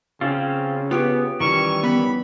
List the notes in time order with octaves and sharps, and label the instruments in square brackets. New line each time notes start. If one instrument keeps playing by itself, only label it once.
[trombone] C#3 [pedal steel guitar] C4 C#4 F4
[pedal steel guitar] B3 [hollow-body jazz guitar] F4 G4 C#5
[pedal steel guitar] D#3 E3 C#4 [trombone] G3 [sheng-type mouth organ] C#6
[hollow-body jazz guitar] B3 [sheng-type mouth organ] B5